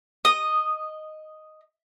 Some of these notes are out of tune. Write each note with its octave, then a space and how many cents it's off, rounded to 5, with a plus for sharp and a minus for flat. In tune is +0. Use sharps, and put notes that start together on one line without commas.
D#5 +0 D#6 -10